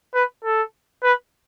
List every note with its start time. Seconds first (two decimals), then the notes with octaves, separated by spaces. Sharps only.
0.15 B4
0.44 A4
1.04 B4